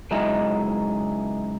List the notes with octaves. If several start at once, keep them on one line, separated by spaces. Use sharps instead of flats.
C#2 F#3 G#3 D#4 E4 D#5